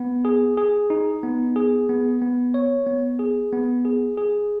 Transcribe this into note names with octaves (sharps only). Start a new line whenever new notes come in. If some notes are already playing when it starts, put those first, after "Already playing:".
Already playing: B3
G#4
G#4
D#4
B3
G#4
B3
B3
C#5
B3
G#4
B3
G#4
G#4